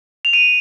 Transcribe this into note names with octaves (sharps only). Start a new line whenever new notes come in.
F7
D#7